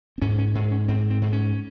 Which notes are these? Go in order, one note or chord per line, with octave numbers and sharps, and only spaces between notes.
C4
G#2 C#4
C#4
G#2
C#4
G#2 C4
C4
G#2
C#4